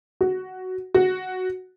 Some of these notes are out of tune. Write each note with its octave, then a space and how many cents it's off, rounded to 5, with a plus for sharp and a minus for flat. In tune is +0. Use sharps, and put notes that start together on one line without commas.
F#4 +5
F#4 +0